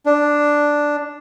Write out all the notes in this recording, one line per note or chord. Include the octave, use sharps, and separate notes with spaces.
D4